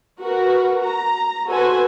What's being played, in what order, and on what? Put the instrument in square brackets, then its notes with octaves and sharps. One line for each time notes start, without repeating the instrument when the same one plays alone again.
[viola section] F#4 A#4 B4
A#5
F#4 A4 B4 C5 G#5